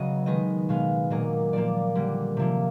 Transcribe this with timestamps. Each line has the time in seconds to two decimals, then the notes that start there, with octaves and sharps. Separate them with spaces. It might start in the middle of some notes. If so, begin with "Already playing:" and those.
Already playing: C#3 F#3 B3 D#5
0.26 D#3 G#3 B3 D#5
0.69 B2 G#3 B3 F5
1.10 A#2 F#3 A#3 D#5
1.53 A#2 F3 A#3 D5
1.95 D3 G3 A#3
2.37 C3 F3 A#3